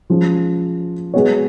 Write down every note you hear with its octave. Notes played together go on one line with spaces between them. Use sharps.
F3 G#3 C#4
G#3 B3 F#4 C#5